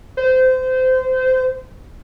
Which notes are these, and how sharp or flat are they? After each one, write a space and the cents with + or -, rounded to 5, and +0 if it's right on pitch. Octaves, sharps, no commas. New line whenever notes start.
C5 -25